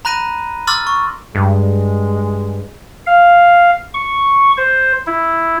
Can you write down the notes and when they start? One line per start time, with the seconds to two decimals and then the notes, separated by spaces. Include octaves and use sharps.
0.05 A#5 B5 F#6 A#6 D#7
0.67 C6 D6 E6 F6 A6
0.87 C#6
1.35 G2 G#3
3.06 F5
3.94 C#6
4.57 C5
5.07 E4